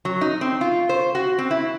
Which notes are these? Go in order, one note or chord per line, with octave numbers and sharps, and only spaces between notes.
F#3
D#4
C4
F4
C5
F#4
C4
E4